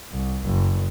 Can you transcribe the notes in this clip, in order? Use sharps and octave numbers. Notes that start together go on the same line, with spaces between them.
C2
F#1